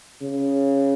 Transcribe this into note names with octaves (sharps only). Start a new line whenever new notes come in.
C#3